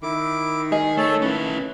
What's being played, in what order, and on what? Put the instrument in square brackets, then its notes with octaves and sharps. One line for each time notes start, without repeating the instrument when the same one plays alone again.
[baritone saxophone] D#3 [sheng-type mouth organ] E4 D6
[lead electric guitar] G#4 [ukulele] D#5
[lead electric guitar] A3 [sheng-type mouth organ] A4 C#5
[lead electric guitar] C#4 E4 [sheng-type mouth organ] B4